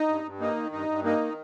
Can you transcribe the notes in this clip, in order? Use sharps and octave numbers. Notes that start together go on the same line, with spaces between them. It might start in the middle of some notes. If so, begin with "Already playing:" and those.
Already playing: D#4
G2
G2
A#3 D#4
D#3
G2 D#4
G2
A#3 D#4
D#3